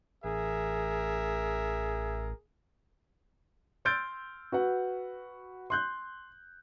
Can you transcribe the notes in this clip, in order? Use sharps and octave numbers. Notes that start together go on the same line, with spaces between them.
A1 G#4 A#4 E5
C6 E6 F6 G6 A6 D7
F#4 B4 F#5
C6 F#6 G6